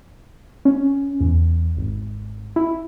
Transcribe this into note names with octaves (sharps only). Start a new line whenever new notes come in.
C#4
E2
G#1
E4